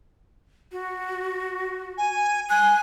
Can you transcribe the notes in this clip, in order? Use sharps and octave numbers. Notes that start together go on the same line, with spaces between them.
F#4
G#5
G#5 F#6